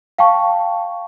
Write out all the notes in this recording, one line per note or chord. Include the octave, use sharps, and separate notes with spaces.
F5 G5 A5 C#6